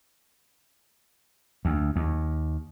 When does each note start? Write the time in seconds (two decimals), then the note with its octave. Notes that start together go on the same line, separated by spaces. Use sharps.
1.65 D2
1.96 D#2